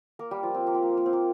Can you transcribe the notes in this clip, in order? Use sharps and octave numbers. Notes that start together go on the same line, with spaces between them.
A#3 A#4
G3 G4
F3 F4
C4
A#3
C4
A#3
C4
A#3
C4
A#3